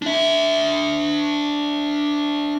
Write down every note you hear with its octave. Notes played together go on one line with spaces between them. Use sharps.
D4 E5